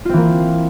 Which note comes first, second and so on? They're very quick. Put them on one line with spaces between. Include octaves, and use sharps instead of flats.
F4 C4 E3 A#3